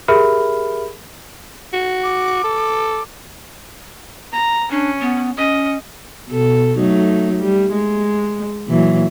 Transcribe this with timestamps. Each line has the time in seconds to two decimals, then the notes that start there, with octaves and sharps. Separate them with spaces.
0.08 G4 G#4 A#4 E5 B5 F6
1.73 F#4
2.03 D6
2.44 A4
4.32 A#5
4.71 C#4 D4
5.01 B3
5.37 C#4 D#5
6.29 B2 A4
6.77 F#3 A3 D#4
7.39 G3
7.72 G#3
8.67 A#2 E3 F#3